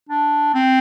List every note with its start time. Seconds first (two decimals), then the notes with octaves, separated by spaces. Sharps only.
0.09 D4
0.54 C4